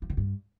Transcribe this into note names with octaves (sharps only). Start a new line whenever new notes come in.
F3
D#3
G2